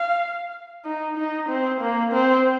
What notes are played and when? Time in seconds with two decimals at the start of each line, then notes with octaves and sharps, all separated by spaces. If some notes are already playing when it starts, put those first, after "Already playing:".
Already playing: F5
0.85 D#4
1.17 D#4
1.49 C4
1.81 A#3
2.12 C4